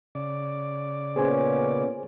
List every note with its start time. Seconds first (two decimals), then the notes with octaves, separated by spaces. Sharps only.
0.15 C#3 D5
1.16 A#2 B3 C#4 G#4 C5 G#5